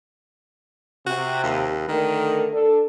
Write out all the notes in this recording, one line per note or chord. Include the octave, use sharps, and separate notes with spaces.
C3 F#4
D#2
D3 D#3 A3 A#4
D4 A4